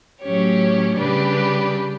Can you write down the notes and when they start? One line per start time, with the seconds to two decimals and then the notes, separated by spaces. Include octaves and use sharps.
0.22 A2 F#3 C#4 G4 C#5
0.97 C#3 G3 D4 G4 B4